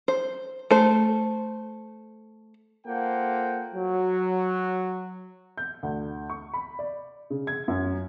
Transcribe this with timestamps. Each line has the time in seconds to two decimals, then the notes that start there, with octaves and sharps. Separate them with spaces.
0.08 C5
0.71 A3 C5
2.87 A#3 F4 A4 C5 F#5 G5
3.74 F#3
5.57 G6
5.83 D2
6.30 C#6
6.54 B5
6.79 D5
7.30 C#3
7.47 G#6
7.68 F#2